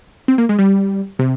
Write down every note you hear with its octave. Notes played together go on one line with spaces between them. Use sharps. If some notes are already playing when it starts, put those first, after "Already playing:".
C4
A#3
G#3
G3
C3